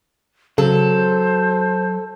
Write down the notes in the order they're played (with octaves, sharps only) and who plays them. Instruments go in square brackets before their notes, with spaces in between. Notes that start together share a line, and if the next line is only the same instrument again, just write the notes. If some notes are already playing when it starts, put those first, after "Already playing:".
[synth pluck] C#3 [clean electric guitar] F#3 [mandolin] A4 [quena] C5